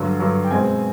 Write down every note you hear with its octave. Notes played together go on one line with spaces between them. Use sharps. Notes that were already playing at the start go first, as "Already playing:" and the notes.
Already playing: G2 D3 F#3
G2 D3 F#3
G5
B2 G#3 C4 G#5